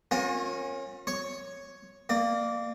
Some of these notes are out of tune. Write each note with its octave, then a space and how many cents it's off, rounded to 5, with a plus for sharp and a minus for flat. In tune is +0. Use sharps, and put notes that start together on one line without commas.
C#4 -25 F4 +45 A#4 +0
C#5 +0 C#6 +0
A#3 -5 D5 +35